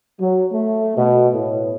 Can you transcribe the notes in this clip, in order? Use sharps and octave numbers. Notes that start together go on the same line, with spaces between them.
F#3
A3
B2
A2